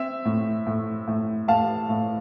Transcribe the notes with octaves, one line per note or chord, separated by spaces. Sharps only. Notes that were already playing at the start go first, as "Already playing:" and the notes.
Already playing: C4 E5
A2
A2
A2
A2 F5 A5
A2